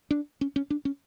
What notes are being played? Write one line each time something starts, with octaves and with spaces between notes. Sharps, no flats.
D4
C#4
C#4
D4
C#4